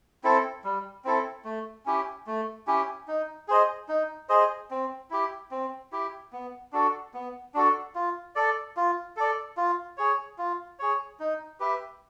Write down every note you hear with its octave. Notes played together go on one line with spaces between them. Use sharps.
C4 E4 A4
G3
C4 E4 A4
A3
C#4 E4 G4
A3
C#4 E4 G4
D#4
G#4 C5 D#5
D#4
G#4 C5 D#5
C4
E4 G4
C4
E4 G4
B3
D4 F#4 A4
B3
D4 F#4 A4
F4
A4 D5
F4
A4 D5
F4
G#4 C#5
F4
G#4 C#5
D#4
G4 B4 E5